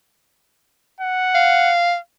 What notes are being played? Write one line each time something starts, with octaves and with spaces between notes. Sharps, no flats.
F#5
F5